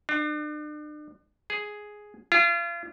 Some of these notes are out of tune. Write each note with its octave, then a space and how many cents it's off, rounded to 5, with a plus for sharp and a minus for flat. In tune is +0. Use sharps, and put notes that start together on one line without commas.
D4 +40
G#4 +5
F4 -35